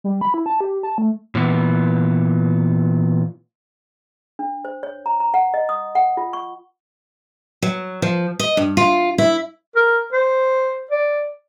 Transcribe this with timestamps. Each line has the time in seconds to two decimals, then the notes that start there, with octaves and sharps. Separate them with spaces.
0.04 G3
0.21 B5
0.34 E4
0.46 A5
0.61 G4
0.83 A5
0.98 A3
1.35 A#2 E3 B3
4.39 D4
4.65 C5
4.83 C#5
5.06 A#5
5.20 A#5
5.34 F#5
5.54 D#5
5.69 D#6
5.95 F#5
6.17 F4
6.33 C#6
7.63 F#3
8.02 F3
8.39 D#5
8.57 G2
8.77 F4
9.18 E4
9.76 A#4
10.13 C5
10.91 D5